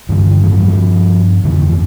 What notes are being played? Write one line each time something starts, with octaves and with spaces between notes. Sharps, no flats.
G2 D3 E3
D3
E3
F3
G3
F3
F2 D3 E3
D3
E3